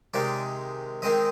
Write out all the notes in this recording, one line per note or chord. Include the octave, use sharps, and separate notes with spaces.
C3 D#3 G#3 D5
D#3 G#3 C4 D#5